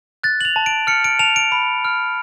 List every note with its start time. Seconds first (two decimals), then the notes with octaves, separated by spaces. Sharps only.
0.24 F#6 A6
0.41 F#7
0.45 F7
0.56 A5
0.66 D7
0.87 F6 C#7
1.04 D7
1.19 A5 F7
1.36 D7
1.52 B5
1.85 F6